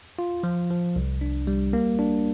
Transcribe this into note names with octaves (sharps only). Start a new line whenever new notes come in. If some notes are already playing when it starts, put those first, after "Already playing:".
F4
F3
F3
C2
D4
G3
A#3
D4